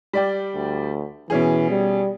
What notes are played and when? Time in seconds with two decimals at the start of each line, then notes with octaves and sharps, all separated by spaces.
0.13 G3 D5 G5
0.55 D2
1.30 B2 E3 C#4 G#4
1.70 G3